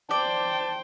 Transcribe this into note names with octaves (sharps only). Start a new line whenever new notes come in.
C5 D5 G5 A5